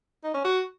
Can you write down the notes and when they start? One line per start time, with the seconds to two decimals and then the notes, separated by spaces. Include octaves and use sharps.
0.24 D#4
0.34 C#4
0.44 F#4